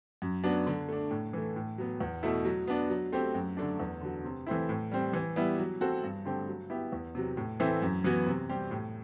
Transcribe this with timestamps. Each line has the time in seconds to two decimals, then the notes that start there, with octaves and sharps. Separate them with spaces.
0.22 F#2
0.44 F#3 B3 D4
0.67 D3
0.89 A3 D4
1.11 A2
1.33 E3 A3
1.56 A2
1.78 F#3 B3
2.00 E2
2.23 B2 A3 E4
2.45 F#3
2.67 B3 D4
2.90 F#3
3.12 A3 C4 G4
3.35 F#2
3.57 D3 A3 D4
3.80 E2
4.01 D3 F#3
4.24 C3
4.46 E3 A3 C4 E4
4.69 A2
4.91 G3 C4
5.13 E3
5.36 G3 B3 E4
5.59 F#3
5.81 C4 F#4 A4
6.03 G2
6.25 D3 A3 C4 G4
6.48 F#3
6.70 B3 E4 G4
6.92 E2
7.15 C3 F#3
7.37 A2
7.60 E3 A3 C4 E4
7.82 F#2
8.04 E3 B3 F#4
8.26 C3
8.49 G3 C4 G4
8.71 A2